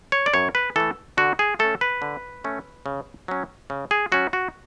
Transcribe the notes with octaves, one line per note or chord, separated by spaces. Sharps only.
C#5
D5
F#2 C#5
B4
E3 A3 A4
D3 F#4
G#4
A3 C#4 A4
B4
D3
A3 C#4
C#3
F#3 C#4
C#3
G#4
F#3 C#4 F#4
F#4